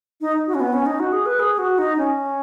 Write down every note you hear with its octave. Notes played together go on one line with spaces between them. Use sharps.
D#4
F#4
C#4
B3
C#4
D#4
F#4
G#4
B4
G#4
F#4
D#4
C#4